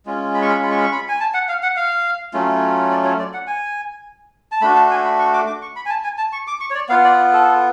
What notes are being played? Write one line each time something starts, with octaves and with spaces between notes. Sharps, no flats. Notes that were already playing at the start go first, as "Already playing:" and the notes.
G#3 C#4 F4
B5
C#6
B5
C#6
B5
C#6
B5
C#6
B5
G#5
A5
F#5
F5
F#5
F5
F#3 A3 C#4 F4
D5
C#5
D5
F#5
G#5
A5
A3 D4 F#4 B5
A5
G#5
B5
C#6
D6
D6
C#6
B5
G#5
A5
G#5
A5
C#6
D6
C#6
C#5
D5
B3 F4 F5
D5
A4